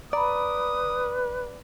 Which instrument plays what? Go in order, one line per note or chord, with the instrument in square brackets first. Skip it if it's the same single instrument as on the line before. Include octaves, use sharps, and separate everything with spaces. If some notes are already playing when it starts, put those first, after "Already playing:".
[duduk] B4 [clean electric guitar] D5 [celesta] A#5 B5 [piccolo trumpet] D#6